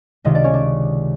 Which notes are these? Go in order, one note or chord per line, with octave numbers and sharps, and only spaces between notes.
C#2 C3 D#3 D#4 D#5
D4 D5
C#4 C#5
D4 D5